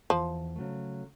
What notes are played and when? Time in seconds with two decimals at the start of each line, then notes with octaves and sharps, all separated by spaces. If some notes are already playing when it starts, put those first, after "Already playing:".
0.10 E2 F3
0.56 C#3 F#3 A3